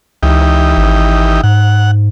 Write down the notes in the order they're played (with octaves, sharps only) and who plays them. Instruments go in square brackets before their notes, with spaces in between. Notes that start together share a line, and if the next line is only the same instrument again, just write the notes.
[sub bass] C#2 [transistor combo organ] E3 D#4 G4
[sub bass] G#1
[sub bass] G#2 [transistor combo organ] F#5